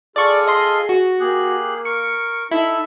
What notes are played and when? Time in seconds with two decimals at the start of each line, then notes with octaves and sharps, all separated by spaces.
0.16 F4 G#4 A4 D5 C#6
0.47 D#5 C6
0.89 F#4
1.20 A#3 G4 G#4 F#6
1.85 A#4 C#6 C#7
2.51 D#4 E4 A4 E5 E6